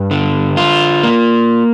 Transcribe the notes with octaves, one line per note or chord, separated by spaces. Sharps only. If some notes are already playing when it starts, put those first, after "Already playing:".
Already playing: G2
D3
F4
A#3